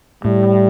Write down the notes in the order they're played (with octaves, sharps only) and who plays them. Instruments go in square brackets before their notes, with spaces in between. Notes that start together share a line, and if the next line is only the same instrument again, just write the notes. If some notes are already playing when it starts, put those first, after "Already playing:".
[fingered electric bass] A2 [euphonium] G3